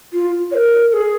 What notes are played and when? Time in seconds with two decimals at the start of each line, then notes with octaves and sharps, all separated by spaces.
0.13 F4
0.51 C#5
0.54 A#4
0.89 A#4
0.93 G#4